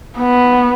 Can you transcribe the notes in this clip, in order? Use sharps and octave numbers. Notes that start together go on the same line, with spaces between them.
B3